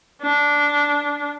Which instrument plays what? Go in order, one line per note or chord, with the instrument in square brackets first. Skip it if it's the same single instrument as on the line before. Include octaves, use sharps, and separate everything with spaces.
[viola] D4